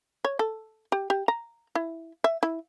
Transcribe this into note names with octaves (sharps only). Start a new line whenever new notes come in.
C#5
A4
G4
G4
A#5
E4
E5
E4